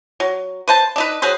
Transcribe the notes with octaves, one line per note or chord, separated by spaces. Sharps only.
F#3
B4 C5 A5
D4 D#4 B4
F#3 G#4 B4 C5